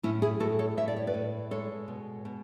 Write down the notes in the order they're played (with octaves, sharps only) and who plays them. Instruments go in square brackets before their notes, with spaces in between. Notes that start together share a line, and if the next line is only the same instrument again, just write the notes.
[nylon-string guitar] A2 C#4 E4
E4 G#4
A2 F#4 A4
A4 C#5
A2 E5
D5
C#5
B4 D5
A2
G#3 A4 C#5
B2
B2